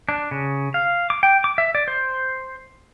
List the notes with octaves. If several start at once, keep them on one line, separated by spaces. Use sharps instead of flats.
D4
C#3
F5
D6
G5
D6
E5
D5
C5